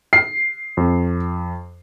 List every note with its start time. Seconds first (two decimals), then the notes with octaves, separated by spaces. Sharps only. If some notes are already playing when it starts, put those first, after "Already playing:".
0.13 C7
0.77 F2